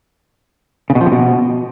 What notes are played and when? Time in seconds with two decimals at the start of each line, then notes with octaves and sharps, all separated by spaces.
0.90 C#3
0.95 B2
1.01 F3
1.06 C3
1.12 B2